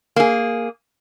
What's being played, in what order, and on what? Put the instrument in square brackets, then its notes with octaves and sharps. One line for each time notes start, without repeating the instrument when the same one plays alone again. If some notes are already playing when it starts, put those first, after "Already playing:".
[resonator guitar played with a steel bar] A#3 G#4